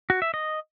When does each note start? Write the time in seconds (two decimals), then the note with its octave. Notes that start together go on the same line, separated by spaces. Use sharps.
0.10 F#4
0.22 E5
0.34 D#5